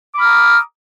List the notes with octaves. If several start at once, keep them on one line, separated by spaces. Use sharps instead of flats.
A#5 B5 D6 D#6 F6